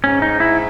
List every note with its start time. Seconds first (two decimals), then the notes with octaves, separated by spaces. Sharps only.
0.03 G#2 C#4
0.22 D#4
0.40 E4